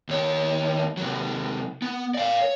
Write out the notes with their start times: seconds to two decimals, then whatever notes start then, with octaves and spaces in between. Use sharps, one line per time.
0.09 D#2 C#5
0.97 C3 F#3
1.82 B3
2.14 D5 F5
2.41 C#5